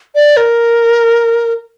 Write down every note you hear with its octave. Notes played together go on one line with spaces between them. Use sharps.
D5
A#4